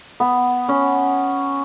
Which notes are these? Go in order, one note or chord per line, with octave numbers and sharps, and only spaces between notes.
B3
C#4